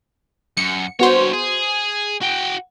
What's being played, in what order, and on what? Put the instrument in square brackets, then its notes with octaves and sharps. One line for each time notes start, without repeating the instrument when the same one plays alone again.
[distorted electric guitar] F#2 [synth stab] C#7
[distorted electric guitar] G2 C#5 [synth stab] B3 F#4 C5
[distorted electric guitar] G#4
F#4 G5